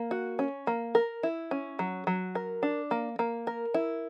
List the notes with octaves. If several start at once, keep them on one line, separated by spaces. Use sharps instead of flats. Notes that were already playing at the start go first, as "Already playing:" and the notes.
Already playing: A#3
F#4
C#4
A#3
A#4
E4
C#4
F#3
F#3
A#4
D4
A#3
A#3
A#4
E4